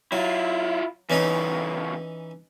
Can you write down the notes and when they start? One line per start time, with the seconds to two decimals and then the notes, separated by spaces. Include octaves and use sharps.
0.12 F#3 E4 F4
1.10 E2 C#3 E3 C#4 D#4